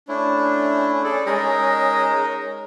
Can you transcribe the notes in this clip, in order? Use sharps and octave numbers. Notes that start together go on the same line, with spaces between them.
A3 C#4 D4 E4
G#4 A4 D5
G#3 D#4 A#4 D#5